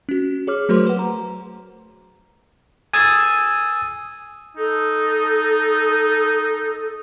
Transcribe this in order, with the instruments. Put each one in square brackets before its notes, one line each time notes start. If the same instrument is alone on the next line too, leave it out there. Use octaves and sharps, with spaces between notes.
[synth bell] C#4 F#4
G#4 C#5 D6 F6
F#3 A3 F#4 A#4 C5 C6
B4 F#5
A#5
[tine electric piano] G#5 D#6 E6 G#6 A6
[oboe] D#4 [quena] A4